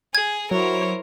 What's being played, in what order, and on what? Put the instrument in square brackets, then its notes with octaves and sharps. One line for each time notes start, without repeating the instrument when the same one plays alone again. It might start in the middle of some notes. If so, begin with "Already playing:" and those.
[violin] G#4 [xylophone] G#6
[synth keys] F#3 [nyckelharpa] E4 C#5 [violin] A#4 C5